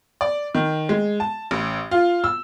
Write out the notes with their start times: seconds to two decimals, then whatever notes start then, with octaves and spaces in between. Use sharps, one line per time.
0.21 D5
0.55 D#3
0.89 G#3
1.20 A5
1.51 A1
1.91 F4
2.24 E6